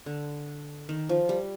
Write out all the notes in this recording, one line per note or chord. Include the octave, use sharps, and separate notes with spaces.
D3
D#3
F3
G3